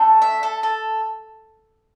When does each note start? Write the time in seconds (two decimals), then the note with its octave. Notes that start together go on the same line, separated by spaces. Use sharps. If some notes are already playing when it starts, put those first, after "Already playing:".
Already playing: A3 D4 A4
0.22 E5
0.43 A4
0.63 A4